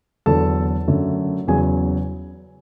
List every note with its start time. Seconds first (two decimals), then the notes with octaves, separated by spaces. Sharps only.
0.26 E2 D3 F#3 A4 A5
0.88 F#2 D3 A3
1.47 E2 C#3 F#3 G#4 G#5